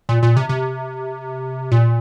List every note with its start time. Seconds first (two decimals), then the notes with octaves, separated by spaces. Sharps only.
0.09 A#2
0.23 A#2
0.37 C3
0.49 C3
1.71 A#2